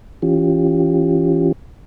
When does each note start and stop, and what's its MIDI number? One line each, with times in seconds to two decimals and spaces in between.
0.22 1.52 52
0.22 1.52 61
0.22 1.52 65
0.22 1.52 67